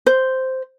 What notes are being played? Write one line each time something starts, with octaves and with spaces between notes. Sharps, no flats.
C5